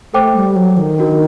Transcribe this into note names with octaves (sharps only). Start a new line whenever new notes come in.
A3 A4 C5 G5 D6
G3
F#3
D#3
D4 F#4 A#4